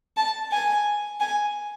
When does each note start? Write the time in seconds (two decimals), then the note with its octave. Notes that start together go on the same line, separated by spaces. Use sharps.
0.17 A5
0.51 G#5
1.20 G#5